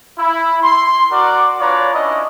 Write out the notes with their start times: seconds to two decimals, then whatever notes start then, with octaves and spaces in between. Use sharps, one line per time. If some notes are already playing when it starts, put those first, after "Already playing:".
0.19 E4
0.63 C6
1.11 F#4 A#4 D5
1.60 D4 F4 B4 C#5 D5 A#5
1.93 C#4 D4 E4 D#5